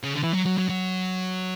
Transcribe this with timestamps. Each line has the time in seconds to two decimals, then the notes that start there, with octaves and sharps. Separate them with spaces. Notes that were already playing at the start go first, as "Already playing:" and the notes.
0.03 C#3
0.14 D3
0.23 E3
0.34 F#3
0.46 F#3
0.58 F#3
0.69 F#3